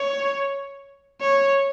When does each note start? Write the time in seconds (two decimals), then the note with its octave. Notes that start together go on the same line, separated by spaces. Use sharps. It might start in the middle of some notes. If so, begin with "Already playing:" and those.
Already playing: C#5
1.21 C#5